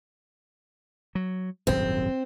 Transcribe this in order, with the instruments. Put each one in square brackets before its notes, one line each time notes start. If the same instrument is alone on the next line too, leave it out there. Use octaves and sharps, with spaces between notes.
[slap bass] F#3
[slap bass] D#1 G#1 F#2 [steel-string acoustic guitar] C4